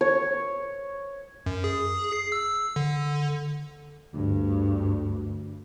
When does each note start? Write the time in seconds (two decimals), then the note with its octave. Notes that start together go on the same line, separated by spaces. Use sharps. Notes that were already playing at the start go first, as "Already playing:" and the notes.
0.01 C#5
1.46 F#2
1.64 G#4
2.13 C7
2.32 E6
2.76 D3
4.14 D2 G2